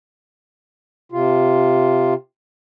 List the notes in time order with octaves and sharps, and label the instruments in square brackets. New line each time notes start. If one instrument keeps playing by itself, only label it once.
[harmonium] C3 F4